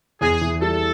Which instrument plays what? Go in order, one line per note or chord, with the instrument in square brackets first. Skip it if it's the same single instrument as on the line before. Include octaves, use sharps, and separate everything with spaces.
[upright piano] E2 [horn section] G#4
[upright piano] E3
[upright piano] G3 [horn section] A4